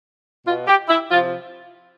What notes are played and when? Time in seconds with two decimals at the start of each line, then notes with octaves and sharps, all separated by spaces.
0.46 B2 F4
0.67 G4
0.89 E4
1.11 C3 F3 F4